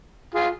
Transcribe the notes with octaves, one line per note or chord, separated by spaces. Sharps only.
F4 G#4